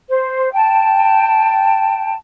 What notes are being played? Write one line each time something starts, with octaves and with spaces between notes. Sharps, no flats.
C5
G5 A5